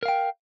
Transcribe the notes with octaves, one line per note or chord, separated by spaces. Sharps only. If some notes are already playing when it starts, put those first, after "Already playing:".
A#4 F5 G5